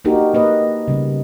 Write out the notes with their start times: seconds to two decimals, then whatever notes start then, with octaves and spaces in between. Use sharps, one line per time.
0.05 A#3 D4 D#4 F#4 G4 A#4
0.34 A#3 B4 D#5
0.88 C#3 G3 B3